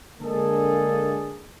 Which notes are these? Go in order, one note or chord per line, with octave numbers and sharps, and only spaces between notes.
D3 G#3 A#3 D4 G#4 A4